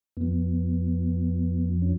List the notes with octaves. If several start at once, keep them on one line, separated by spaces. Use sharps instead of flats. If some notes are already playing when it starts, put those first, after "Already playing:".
F2 F3 B3
C#4